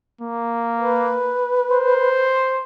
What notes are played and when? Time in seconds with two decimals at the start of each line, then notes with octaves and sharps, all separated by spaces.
0.21 A#3
0.79 B4
1.71 C5